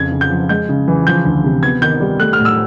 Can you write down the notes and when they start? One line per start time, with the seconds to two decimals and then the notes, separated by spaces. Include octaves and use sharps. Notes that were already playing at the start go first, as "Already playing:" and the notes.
Already playing: F2 C#3 G#6
0.12 C#3
0.21 G6
0.31 F3
0.49 G#3 G6
0.69 C#3
0.88 E3
1.07 F3 G6
1.25 D2
1.44 C3
1.63 B3 G#6
1.82 D#3 G6
2.00 G3
2.20 A3 F#6
2.33 F6
2.39 A2
2.45 E6